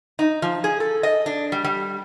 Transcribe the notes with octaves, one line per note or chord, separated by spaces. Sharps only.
D#4
F3
G#4
A4
D#5
D4
G3
G3